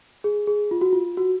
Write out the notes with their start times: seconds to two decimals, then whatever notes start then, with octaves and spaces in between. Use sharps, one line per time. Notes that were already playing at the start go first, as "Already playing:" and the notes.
0.24 G#4
0.47 G#4
0.71 F4
0.81 F#4
0.93 F4
1.17 F#4